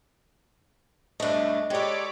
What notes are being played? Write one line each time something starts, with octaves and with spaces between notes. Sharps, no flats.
B1 G2 A3 D4 D#5
G#3 G4 A4 C#5 D5 B5 D6